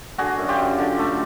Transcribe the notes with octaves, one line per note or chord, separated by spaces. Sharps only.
D3 F#4 G#4
F#2
F4 G4
F#2
D3
A3